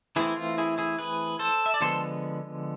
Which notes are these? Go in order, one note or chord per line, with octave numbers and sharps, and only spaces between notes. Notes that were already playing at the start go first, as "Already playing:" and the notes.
E3 A3 C4 E4 G#4
F4
E4 G#4
E4 G#4
G#4 B4
A4 C5
E5
D5
D3 F3 G#3 B3 A4 C5